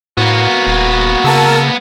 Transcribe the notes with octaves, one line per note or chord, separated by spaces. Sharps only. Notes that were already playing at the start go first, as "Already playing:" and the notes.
A2 A#3 B3 F#4
D#1
C#3 A#4 A5 E6